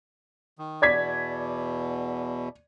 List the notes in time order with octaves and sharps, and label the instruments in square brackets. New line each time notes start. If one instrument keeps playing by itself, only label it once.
[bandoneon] D#3
[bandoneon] E2 B2 [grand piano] D5 G#6 B6